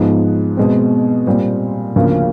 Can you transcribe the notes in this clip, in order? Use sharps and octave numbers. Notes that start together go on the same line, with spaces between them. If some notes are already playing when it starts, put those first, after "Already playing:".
Already playing: G#2 F3 G#3 B3 D#4
B2 G#3 C4
A#2 G3 C4
D2 C#3 F3 A#3